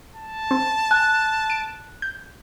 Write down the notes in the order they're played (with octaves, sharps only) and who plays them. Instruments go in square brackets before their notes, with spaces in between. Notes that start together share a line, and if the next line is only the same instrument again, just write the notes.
[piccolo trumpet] A5
[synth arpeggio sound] C4
[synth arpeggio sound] G#5 [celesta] F#6
[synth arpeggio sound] D7
G6